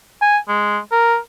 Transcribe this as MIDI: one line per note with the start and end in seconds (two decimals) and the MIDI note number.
0.22 0.38 80
0.48 0.78 56
0.92 1.16 70